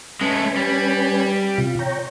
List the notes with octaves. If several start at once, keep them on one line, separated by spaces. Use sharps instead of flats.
G#3 A3 C#4 B4 G#5
G3
C3 F4
C#5 G5 A#5